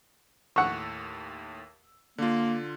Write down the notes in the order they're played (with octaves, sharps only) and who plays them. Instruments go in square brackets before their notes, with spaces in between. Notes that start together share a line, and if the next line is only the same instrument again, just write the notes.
[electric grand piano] D#2 A2 E6 [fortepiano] F#5 C#6
[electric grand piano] D3 F4 [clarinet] A#3